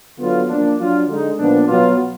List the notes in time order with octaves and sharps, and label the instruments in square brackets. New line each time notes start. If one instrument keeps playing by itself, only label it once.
[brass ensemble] D3 F#3 B3 F4
F3 A#3 D4
F#3 D4 F4
D3 G#3 D#4
A#2 F3 B3 D4
B2 F#3 B3 F4